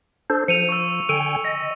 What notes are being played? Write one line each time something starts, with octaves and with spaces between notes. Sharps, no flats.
D4 A4 C5
F3 C#7 D#7 F7
C#6 E6
D3 G5 G#5 E6
D#5